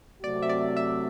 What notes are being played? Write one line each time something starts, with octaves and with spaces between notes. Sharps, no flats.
C3 F#3 A3 C4 F#4 D5
E5
D5
E5